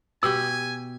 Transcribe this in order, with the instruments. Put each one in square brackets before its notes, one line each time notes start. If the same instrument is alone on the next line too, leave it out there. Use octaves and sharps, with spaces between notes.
[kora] B2 G4 [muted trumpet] G#5 [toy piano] E6